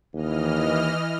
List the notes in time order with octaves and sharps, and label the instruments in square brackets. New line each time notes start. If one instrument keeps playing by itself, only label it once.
[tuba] D#2 [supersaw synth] E3 D#5 F6